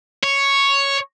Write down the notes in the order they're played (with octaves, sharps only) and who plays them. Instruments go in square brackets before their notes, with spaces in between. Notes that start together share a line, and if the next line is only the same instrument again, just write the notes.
[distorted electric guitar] C#5